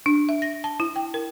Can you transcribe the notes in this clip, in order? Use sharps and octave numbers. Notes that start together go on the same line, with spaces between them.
D4
E5
A#6
A5
E4
G5
A#4